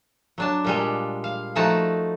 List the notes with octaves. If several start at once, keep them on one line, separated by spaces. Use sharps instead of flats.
F#3 D4 A5
A#2 G3 G#3
F5
F3 A3 D#4 F#4 A5 A#5